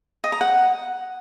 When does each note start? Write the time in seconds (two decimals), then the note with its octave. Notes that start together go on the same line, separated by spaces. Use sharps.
0.24 D#5
0.32 A#5
0.41 F#5